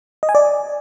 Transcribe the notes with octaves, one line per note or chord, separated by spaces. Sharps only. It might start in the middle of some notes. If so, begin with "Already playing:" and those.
D#5
G#5
D5